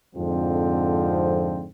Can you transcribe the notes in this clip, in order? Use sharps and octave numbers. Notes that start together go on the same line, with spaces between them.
F2 G#2 D3 F3 C4